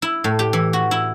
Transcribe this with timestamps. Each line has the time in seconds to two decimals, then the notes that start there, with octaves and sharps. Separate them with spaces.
0.02 E4
0.24 A2
0.39 G4
0.53 E3
0.73 F#4
0.91 E4